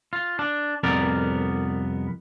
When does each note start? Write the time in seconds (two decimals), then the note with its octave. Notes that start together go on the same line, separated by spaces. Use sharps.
0.13 F4
0.39 D4
0.83 C2 F2 B3 A#4 D5